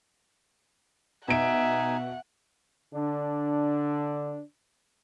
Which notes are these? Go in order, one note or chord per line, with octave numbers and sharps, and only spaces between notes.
B2 D#4 E5 F#5 G#5 D7
D3 D4